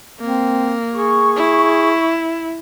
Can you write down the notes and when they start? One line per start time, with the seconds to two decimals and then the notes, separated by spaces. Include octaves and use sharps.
0.21 A#3 C4
0.94 G#4 C#6
1.37 E4